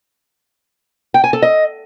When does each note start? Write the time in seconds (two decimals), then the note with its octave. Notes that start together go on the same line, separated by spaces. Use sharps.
1.14 G5
1.24 G#5
1.33 A4
1.42 D#5